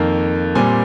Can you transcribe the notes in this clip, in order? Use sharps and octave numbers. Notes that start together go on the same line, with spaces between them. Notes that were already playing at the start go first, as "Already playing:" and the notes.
Already playing: F2 D#3 A#3 F5
A#2 G3 C4 G#5